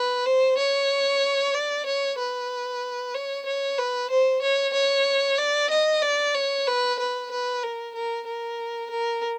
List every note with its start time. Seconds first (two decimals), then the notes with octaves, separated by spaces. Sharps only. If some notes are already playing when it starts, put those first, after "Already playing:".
Already playing: B4
0.26 C5
0.58 C#5
1.54 D5
1.86 C#5
2.18 B4
3.15 C#5
3.46 C#5
3.78 B4
4.11 C5
4.42 C#5
4.74 C#5
5.38 D5
5.71 D#5
6.02 D5
6.35 C#5
6.67 B4
6.99 B4
7.31 B4
7.63 A#4
7.95 A#4
8.27 A#4
8.91 A#4